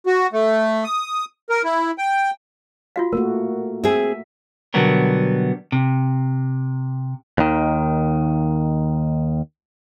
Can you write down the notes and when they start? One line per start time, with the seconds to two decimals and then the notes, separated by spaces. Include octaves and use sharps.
0.06 F#4
0.33 A3
0.84 D#6
1.50 A#4
1.64 E4
1.98 G5
2.96 F4 F#4 F5
3.13 A3 A#3 F#4 A#4
3.84 C4 G#4 E5
4.74 B2 D3 F#3 G3 B3 A#4
5.72 C3
7.38 D#2 D#3